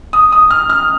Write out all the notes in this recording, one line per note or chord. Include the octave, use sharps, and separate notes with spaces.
D#6
D#6
F6
F6